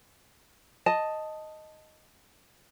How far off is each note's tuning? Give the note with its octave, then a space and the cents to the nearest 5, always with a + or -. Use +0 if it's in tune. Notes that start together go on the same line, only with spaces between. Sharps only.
D#5 +0 A5 +0